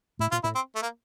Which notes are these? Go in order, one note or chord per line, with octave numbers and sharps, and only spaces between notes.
A2 E4
A#2 F4
A2 E4
C4
A3
A#3